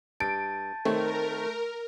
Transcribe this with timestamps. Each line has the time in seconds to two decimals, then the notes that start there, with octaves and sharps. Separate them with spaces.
0.20 G2 A5 G6 A6 D7
0.85 D#3 A3 C4 A#4 C#5